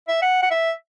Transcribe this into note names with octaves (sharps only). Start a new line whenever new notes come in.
E5
F#5
F#5
E5